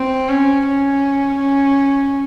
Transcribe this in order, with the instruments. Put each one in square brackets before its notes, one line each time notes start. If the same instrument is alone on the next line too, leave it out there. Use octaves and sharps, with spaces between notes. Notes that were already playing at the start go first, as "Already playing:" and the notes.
Already playing: [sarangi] C4
C#4
C#4
C#4